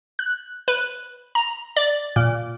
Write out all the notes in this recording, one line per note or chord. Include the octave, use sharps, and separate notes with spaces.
F#6
B4
A#5
D5
A#2